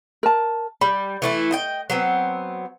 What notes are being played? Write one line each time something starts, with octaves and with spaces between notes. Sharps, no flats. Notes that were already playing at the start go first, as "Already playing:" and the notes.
A#4 A5
G3 B5
E3 A3 E4
D#5 G5
F#3 B3 C4